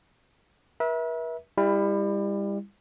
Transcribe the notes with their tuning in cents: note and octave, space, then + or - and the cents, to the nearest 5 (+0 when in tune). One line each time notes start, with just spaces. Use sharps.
B4 -45 E5 -20
G3 +30 E4 +0